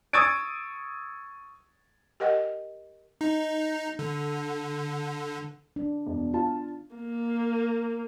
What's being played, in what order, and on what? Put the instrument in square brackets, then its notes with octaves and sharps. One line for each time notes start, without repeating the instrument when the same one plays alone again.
[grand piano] C#6 D#6 E6 G#6 A6 D7
[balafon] G4 A#4 D#5 F#5 G5
[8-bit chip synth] D#4
D3
[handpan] D4
[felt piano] E1
F4 A5
[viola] A#3